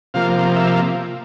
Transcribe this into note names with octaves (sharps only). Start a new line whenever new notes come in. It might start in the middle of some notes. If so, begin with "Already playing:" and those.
C3 F3 A#3 F5
E5